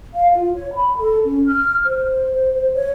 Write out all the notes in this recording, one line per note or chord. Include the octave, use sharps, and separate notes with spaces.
F5
F4
C#5
B5
A4
C#4
F6
C5
C5
C5
C#5